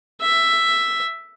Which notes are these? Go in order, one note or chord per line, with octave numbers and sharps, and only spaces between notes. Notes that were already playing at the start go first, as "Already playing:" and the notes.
E5